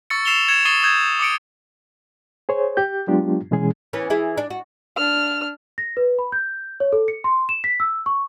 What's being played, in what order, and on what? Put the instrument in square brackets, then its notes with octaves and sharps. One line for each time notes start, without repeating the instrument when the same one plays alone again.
[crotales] C#6 E6 A6 C#7
E6 C7 E7 F7 G7
G#6 C#7 E7
C#6 D#6 A6 C7 D#7 G7
D#6 G6 G#6
D6 D#6 C#7 D7
[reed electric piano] G#4 C5 C#5
G4 G6
F#3 G#3 B3 D4 F4 G4
B2 E3 G#3 C#4 G#4
[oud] E3 B3 C#4
E3 E4 G#4
D4
F#4
[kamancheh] D4 F6
[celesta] A#6
B4
B5
G6
C#5
A4
C#7
C6
E7
B6
E6
C#6